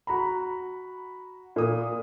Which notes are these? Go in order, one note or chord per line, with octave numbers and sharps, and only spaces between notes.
F#4 A#5 B5
A#2 A#3 D#6